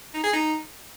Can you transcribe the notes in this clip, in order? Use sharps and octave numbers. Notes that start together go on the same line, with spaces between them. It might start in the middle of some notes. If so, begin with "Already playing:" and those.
D#4
G#4
D#4